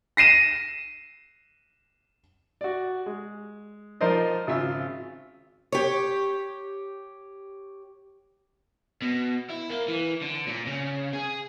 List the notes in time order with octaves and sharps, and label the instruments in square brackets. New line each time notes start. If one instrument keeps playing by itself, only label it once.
[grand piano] A#6 C7 D#7 E7
[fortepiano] F#4 D5
G#3
F3 D#4 A#4 C5 D5 D#5
G#1 C#3 F4 E5
[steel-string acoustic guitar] G4 C#5
[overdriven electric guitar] B2
E4
A#3
E3
D3
A#2
C#3
G#4